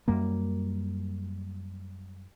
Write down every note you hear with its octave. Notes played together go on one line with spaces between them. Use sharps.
F#2 G3 A#3